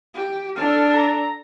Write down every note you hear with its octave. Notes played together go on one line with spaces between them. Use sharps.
G4
D4 A4 F6
A#5